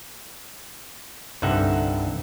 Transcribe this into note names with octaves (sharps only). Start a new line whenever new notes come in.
C2 G2 D3 D#4 E5 F#5